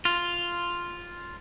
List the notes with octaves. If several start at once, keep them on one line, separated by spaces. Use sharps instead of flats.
F4